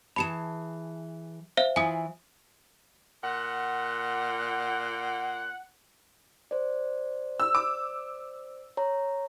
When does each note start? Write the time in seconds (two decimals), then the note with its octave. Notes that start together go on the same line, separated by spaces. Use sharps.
0.16 E3 G#4 A5 B5 C#7 E7
1.57 C5 E5 F5
1.76 E3 E4 F4 G#5 D#6
3.23 A#2 F#5
6.51 C5 D5
7.40 E6
7.55 D6
8.77 C#5 A#5